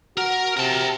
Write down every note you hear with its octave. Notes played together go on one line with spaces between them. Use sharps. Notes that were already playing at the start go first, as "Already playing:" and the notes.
F#4 A#4
C3 A#4 A5